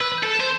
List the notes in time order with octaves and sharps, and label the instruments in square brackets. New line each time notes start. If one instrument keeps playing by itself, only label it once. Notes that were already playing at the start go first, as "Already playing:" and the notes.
[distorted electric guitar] B4 [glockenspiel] E6
[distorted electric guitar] A4 [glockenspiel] G6
[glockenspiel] G6
[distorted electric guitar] C5